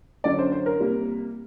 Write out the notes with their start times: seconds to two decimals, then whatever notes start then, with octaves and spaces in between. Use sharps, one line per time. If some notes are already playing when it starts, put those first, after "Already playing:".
0.24 F#2 D3 F#3 D5
0.39 C5
0.52 C5
0.66 A#4
0.80 C3 G3 A#3